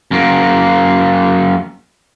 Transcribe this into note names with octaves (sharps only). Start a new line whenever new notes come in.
F#2 A#3